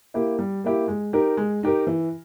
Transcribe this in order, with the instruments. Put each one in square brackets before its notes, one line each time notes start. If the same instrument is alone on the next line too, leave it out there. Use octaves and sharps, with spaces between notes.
[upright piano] A#3 E4 G4
G3
A#3 E4 G4
G#3
D#4 G4 A#4
G#3
D#4 G4 A#4
E3